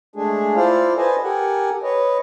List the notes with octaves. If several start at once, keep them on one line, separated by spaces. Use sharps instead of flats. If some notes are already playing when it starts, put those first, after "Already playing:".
G#3 A3 D4 G#4
E4 F4 A4 C5 D5 F5
A4 B4 C5 D#5 G#5 A5
G4 A4 A#4 F#5 G#5
B4 C#5 D#5